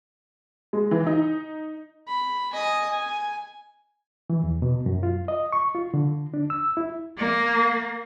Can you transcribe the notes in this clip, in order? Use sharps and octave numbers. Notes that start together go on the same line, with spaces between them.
G#3
E3
D#4
B5
D#5 G#5
G#5
E3
E2
B2
F#2
F4
D#5
C#6
F4
D3
D4
E6
E4
A#3